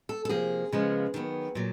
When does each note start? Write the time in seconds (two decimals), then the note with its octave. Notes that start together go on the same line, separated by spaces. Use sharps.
0.09 A4
0.25 A4
0.29 C3 F3 A#3 G#4
0.72 C#3 F3 G#3 B3
1.14 D#3 F#3 B3
1.55 A#2 F#3